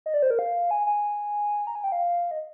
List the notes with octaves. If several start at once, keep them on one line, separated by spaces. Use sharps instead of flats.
D#5
D5
C5
A#4
F5
G#5
G#5
A#5
G#5
G5
F5
D#5